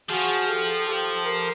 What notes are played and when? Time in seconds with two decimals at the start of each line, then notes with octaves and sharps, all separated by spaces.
0.10 F3 F#4 G#4
0.48 G4 A4
0.86 G4 A4
1.24 A#4